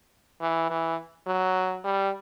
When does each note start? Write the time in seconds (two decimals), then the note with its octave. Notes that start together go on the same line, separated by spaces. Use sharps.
0.41 E3
0.70 E3
1.27 F#3
1.84 G3